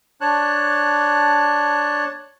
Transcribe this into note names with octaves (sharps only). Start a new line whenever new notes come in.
D4 C#5 A5 F#6